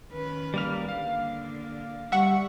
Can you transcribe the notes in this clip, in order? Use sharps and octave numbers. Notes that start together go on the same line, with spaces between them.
D#3 C#4 B4
G3 A#3 F6
D3 A#3 F5
G3 E5 F#5 C#6